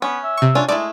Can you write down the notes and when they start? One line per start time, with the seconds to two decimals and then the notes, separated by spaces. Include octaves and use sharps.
0.02 B3 C#4
0.23 E5
0.37 C3 C#6
0.55 C#4 D4 F4
0.69 G#3 A3 E4 D5